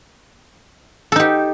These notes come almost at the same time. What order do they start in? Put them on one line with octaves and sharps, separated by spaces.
A4 D#4 G4